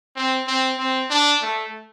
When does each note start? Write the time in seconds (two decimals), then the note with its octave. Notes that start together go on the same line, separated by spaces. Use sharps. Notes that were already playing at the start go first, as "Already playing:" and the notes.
0.16 C4
0.48 C4
0.79 C4
1.10 D4
1.42 A3